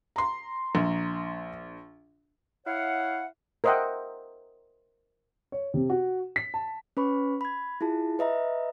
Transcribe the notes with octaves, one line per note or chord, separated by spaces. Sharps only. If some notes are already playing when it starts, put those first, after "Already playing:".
A#5 C6
A#1
E4 C#5 F5 F#5
A#4 C5 D#5 E5 F#5 G5
C#5
C3
F#4
B6
A5
C#4 B4 B5 C#6
B5 G#6
E4 F4 G#4 A5
B4 D#5 E5 A#5